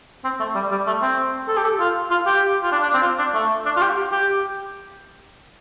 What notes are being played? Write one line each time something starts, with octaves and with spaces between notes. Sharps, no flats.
C4
A3
G3
G3
A3
C4
A4
G4
A4
F4
F4
G4
F4
D4
D4
C4
F4
D4
A3
D4
F4
G4
G4